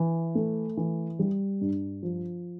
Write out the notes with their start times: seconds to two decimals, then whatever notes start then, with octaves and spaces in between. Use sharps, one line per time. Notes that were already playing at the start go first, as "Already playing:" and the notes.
Already playing: E3
0.35 A3
0.77 E3
1.19 G3
1.61 G2
2.03 F3